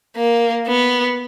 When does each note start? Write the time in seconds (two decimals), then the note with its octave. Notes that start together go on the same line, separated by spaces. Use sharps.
0.16 A#3
0.67 B3